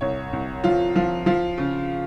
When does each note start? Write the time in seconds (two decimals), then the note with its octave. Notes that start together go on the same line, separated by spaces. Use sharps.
0.01 C2 C#5
0.33 C2
0.64 F3 F4
0.95 F3 F4
1.26 F3 F4
1.58 C#3